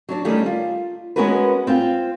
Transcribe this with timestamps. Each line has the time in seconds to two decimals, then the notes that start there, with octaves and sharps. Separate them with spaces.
0.09 F#3 D4 D5
0.25 D#3 G3 A3 C#4 D4
0.46 F4
1.16 G#3 B3 C#4 F#4 A#4 B4
1.67 C4 F4 G5